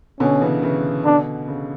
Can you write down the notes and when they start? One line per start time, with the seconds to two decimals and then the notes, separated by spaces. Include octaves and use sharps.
0.20 B2 D3 C#4
0.41 C#3 E3
0.63 C#3 E3
1.05 B2 D3 D4
1.48 C#3